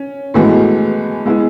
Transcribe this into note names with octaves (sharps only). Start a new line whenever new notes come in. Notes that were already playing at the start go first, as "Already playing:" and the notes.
Already playing: C#4
A2 E3 G#3 B3 F#4
G#3 B3 E4 G#4